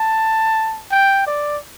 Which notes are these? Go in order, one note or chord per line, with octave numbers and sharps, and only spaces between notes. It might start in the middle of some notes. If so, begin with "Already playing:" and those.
Already playing: A5
G5
D5